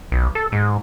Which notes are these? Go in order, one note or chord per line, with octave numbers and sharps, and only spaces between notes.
B1
A4
G#2